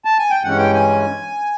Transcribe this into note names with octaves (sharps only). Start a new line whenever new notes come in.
A5
G#5
G5
G2 E3 G#3 C#4 F#5
G5
G#5